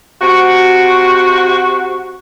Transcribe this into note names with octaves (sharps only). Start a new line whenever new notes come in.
C3 F#4